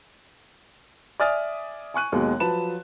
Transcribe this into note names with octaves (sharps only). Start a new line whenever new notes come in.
D5 E5 G#5 D#6 F6 A6
G#5 C#6 F#6 D#7
D#2 B2 F#3 G#3
F3 F#3 B4 A5 E7